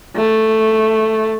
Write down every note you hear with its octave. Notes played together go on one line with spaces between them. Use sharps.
A3